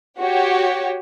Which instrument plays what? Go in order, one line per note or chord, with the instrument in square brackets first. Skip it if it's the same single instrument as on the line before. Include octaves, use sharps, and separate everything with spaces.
[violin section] F#4 G4 C#5